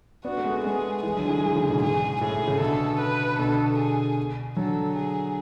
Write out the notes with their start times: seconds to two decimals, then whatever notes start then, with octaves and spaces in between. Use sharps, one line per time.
0.25 B3 D4 F#4
0.38 A3
0.44 G#3 B3
0.64 G#3 B3 G#4
1.03 E3 G#3 G#4
1.17 D3 F#3
1.29 E3 G#3
1.43 D3 F#3
1.56 C#3 E3
1.69 G#2 B2
1.82 G#2 G#4
2.21 A2 G#4
2.34 A2
2.47 A2 C#3
2.60 B2 D3 A4
3.00 B4
3.39 B2 D3 A4
3.78 G#4
4.56 D3 F#3 A4
4.96 G#4